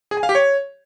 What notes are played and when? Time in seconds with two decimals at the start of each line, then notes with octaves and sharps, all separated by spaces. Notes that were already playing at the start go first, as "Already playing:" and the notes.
0.11 G#4
0.17 G#5
0.23 F5
0.29 G4
0.35 C#5